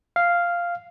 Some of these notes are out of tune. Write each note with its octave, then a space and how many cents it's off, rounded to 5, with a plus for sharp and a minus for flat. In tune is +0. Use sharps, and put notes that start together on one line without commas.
F5 -5